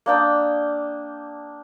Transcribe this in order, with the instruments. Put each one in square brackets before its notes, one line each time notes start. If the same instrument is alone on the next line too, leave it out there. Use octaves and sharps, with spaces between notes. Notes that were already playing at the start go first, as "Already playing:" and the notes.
[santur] A#3 D4 G5 D#6